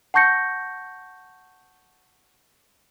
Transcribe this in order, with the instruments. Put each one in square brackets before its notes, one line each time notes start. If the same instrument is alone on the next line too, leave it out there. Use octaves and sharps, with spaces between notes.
[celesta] F#5 A5 C#6 G6 A#6 C#7